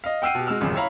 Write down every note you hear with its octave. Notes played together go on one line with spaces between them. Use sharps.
D#5 F5
F#5 G5 E6 F6 C7 D#7
B2 G4
G#3 F#4 E6 F6
D#1 A1 F#2 C#3
E4 C#5 E5 F5 A#5 B5